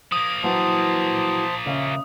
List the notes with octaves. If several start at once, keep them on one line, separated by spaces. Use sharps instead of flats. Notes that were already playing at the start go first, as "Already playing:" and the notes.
F3 A#3 D#6
E3 F#3 B3 C5 A5
D#2 C#3 C#4 E5